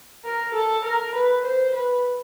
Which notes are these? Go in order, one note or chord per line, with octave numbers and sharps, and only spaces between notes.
A#4
A4
A#4
B4
C5
B4